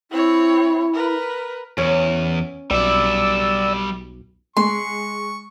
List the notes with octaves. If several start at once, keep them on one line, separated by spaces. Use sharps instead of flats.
C4 E4 C#5
A#4 B4
E2 C#4
B1 G3 D5 E5 E6
G#3 C6 C#6